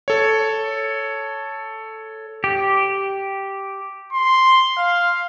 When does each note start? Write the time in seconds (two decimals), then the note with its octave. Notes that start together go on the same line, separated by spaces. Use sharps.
0.08 A4 C#5
2.44 G4
4.13 C6
4.77 F5